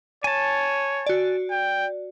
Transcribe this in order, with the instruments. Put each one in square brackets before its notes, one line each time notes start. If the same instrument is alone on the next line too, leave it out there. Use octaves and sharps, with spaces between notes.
[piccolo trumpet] C#5 [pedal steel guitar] G#5 A5
[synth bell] F#4 D5
[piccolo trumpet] G5